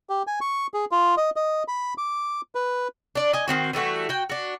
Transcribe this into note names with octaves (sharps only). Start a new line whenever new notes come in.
G4
G#5
C#6
G#4
F4
D#5
D#5
B5
D6
B4
D4 D5
D#5 G#5
D#3 G3 C4 F#4
E3 G3 A3 F#4
F#4 G5
D4 F#4